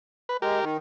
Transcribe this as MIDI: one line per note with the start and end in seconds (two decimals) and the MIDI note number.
0.29 0.37 71
0.42 0.60 56
0.42 0.65 67
0.42 0.65 70
0.61 0.77 51